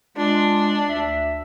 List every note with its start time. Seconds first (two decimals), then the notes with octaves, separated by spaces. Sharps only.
0.17 G#3 D4 F4
0.89 D2 E5